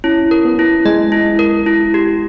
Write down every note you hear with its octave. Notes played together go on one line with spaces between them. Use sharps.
C#4 E4
A#4
B3
E4
G#3 D#5
E4
A#4
E4
G4